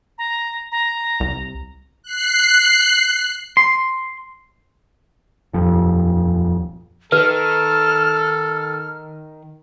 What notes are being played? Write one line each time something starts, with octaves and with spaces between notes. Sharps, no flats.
A#5
A#5
C2
F#6 C7
C6
D#1 F2
D#3 A4 B4 F6